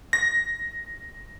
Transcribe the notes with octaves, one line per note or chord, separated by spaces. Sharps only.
A#6